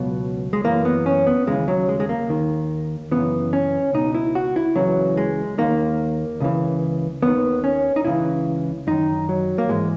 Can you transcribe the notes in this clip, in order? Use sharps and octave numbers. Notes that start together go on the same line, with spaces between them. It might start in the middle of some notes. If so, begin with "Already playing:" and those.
Already playing: C#2 B2 F#3
G#3
F#2 E3 A#3
B3
C#4
B3
D#2 C#3 E3 G#3
F#3
G#3
G#3
A#3
D#2 D#3
F#2 C#3 E3 B3
C#4
C#2 B2 D#4
E4
F#4
E4
C#2 C#3 E3 F#3
G#3
D#2 D#3 A#3
C#2 C#3 E3
D#2 D#3 B3
C#4
D#4
C#2 C#3 E3 E4
F#2 D#3 D#4
F#3
A#3
G#2 E3 G#3